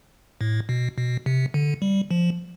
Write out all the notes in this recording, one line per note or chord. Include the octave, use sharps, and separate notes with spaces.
A2
B2
B2
C3
D3
G3
F3